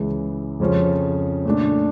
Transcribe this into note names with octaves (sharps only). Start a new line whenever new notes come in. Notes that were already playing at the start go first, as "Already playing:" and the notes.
Already playing: C#2 C#3 E3
F2 C#3 F3 C#4
A#2 A3 D4